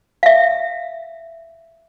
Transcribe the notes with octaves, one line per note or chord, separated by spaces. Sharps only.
E5 F5